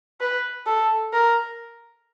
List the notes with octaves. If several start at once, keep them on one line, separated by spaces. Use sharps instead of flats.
B4
A4
A#4